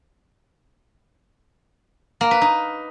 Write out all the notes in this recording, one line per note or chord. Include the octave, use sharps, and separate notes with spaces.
A#3
B4
D#4